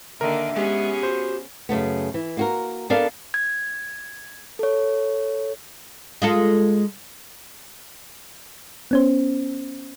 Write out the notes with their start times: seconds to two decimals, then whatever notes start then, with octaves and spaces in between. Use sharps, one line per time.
0.21 D3 D#3 A#3 A#4 E5
0.57 G#3 B3 C#4 G4 G#4
1.03 F#4 C5
1.69 F#2 C#3 A3 B3
2.14 E3
2.37 A#3 F#4 A#4
2.90 B3 D4 A4 A#4 D5 F5
3.34 G#6
4.59 A4 C#5
6.22 G#3 F4 A4
8.91 B3 C#4 C5